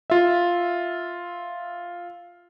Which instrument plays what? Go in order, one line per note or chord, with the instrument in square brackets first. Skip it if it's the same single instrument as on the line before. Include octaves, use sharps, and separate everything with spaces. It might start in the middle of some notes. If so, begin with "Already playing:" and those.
[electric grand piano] F4 E5